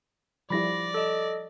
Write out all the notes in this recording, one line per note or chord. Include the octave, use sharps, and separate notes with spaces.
F3 G3 E4 D5 B5 A#6
A4 D#5